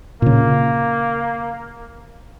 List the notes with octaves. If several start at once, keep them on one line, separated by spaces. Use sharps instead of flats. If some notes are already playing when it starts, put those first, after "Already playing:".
A#2 C#3 A#3